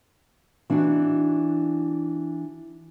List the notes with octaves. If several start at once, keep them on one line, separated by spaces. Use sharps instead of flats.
E3 D4 D#4 F#4